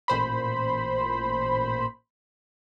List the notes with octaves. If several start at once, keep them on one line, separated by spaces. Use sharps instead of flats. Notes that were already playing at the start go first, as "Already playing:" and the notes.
A1 A#2 C5 B5